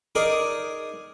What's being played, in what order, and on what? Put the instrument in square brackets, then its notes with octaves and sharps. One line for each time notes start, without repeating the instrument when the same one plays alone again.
[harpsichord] D#4 G#4 A#4 D5